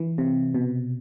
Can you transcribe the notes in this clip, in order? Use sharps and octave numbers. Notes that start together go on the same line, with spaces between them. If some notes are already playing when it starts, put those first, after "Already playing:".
Already playing: E3
C3
B2